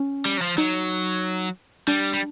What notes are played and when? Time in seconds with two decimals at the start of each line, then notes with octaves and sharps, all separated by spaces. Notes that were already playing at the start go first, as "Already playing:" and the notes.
Already playing: C#4
0.25 G3
0.38 F#3
0.42 F3
0.57 F#3 D#4
1.88 G3 D4
2.13 G3